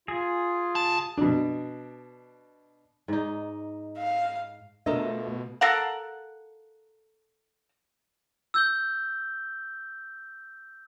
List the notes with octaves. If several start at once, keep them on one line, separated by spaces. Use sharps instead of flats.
F4 G#4 G#5
C#2 A5
B2 D4
G#2 D#4
F5
B2 A3 D4 F4 A4 A#4 D#5
A4 A#4 F5 F#5
E6 G6 G7